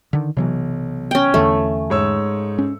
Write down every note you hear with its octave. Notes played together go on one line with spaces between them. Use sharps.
D3 D#3
B1 C3 E3 F#3
C#4 G5
E2 D3 E3 A3
G#2 C#5 E6
C#4